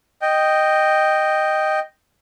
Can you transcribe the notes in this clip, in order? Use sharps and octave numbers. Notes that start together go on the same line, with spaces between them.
D#5 G5